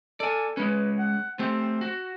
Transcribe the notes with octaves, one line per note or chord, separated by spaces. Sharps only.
A4 D5 G#5
G#3 C#4 B4
F#5
A3 C4 G4
F#4